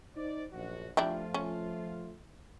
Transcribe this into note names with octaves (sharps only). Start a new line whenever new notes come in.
D#4 C5 D5
A#1 F#2 F#4
F3 A3 D4 E4 F4 G4
C#4